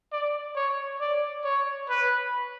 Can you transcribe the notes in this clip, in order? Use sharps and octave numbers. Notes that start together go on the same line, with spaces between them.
D5
C#5
D5
C#5
B4